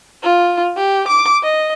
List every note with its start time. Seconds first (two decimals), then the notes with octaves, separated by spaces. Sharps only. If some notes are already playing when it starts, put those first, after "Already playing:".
0.23 F4
0.76 G4
1.08 D6
1.43 D#5